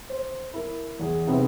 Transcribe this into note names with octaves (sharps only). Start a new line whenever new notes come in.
C5
E4 A#4
E2 G#4
C3 B3 C4 D#4 E4 G#4